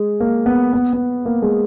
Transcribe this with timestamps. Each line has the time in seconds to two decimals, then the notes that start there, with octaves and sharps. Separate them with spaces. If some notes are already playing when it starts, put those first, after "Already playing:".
Already playing: G#3
0.20 A#3
0.46 B3
0.73 B3
0.93 B3
1.25 A#3
1.42 G#3